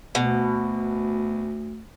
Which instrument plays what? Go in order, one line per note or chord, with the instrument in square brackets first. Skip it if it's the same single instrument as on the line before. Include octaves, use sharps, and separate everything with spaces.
[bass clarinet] D2 [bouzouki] B2